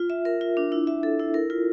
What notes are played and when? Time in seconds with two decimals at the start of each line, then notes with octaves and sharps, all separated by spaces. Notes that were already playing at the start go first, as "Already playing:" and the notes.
Already playing: F4
0.10 E5
0.25 A#4
0.41 F4
0.57 D4
0.72 E4
0.87 E5
1.03 A4
1.19 E4
1.34 A#4
1.50 F4